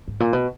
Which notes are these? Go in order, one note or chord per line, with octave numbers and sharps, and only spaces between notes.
G#2
A#2
B2